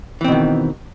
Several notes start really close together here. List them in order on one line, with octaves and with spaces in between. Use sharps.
E3 C4 B2 D#3